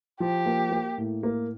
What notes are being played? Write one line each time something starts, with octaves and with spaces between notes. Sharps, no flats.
F3 G4
A#3
A#3
A2
A#3